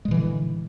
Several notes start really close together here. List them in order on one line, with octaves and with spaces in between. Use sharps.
G#3 A#2 E3 D3